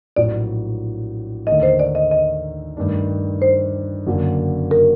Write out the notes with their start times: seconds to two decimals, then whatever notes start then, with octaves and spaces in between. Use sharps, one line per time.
0.16 A#1 A2 F#3 D5
1.47 D#2 D3 A3 D#4 D#5
1.63 C5
1.79 D5
1.95 D#5
2.11 D#5
2.77 G2 D#3 A3 D4
3.42 C5
4.06 F#1 F#2 D3 F#3 A#3
4.71 A#4